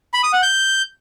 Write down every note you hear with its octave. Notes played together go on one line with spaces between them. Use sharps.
B5
D#6
F#5
G6